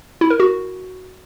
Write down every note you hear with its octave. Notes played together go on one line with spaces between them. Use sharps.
E4
A#4
F#4